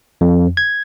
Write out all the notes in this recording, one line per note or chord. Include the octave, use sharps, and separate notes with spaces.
F2
G#6